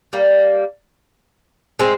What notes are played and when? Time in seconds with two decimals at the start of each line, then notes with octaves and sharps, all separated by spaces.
0.13 G3 A#3
1.79 G#3 C4